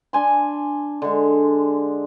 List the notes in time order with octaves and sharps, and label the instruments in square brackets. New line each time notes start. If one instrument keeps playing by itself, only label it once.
[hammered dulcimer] D4 G#5 C6
D3 G#3